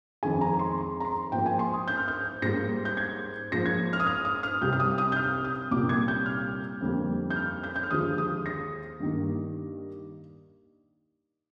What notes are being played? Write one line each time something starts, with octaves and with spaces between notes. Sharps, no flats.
F2 D#3 G#3 G#5
A#5
C6
C6
A#5
C6
G#2 F3 A#3 G5
G#5
C6
D#6
G6
F6
G6
G#2 G3 A#3 A#6
G6
G#6
G#2 F3 A#3 A#6
G#6
F6
D#6
F6
D#6
F6
C2 C3 G3 G6
F6
D#6
D#6
G6
F6
D#6
C2 A#2 G3 A#3 D6
G#6
G6
F6
F2 D3 G3 A#3
G6
F6
G6
G6
F6
D#2 D3 F3 G#3 D#6
D#6
A#6
G2 D#3 A#3